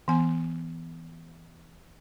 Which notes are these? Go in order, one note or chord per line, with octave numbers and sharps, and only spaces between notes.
E3 B3 G#5